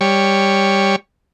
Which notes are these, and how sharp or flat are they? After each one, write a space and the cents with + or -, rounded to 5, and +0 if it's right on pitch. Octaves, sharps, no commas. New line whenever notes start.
G3 +10 C#5 +0